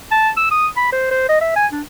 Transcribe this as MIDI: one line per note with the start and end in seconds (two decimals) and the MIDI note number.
0.11 0.29 81
0.37 0.48 88
0.51 0.67 87
0.76 0.90 83
0.92 1.08 72
1.11 1.27 72
1.29 1.38 75
1.41 1.54 76
1.56 1.66 80
1.72 1.81 62